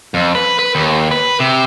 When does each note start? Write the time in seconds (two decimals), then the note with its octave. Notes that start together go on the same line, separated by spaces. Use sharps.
0.14 F2
0.35 B4
0.59 B4
0.75 D#2
1.11 B4
1.40 C3